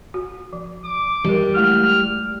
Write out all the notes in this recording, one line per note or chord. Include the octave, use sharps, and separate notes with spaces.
F#4
F3
D6
G3 A#4 D#5
G#3 A3 E4 F6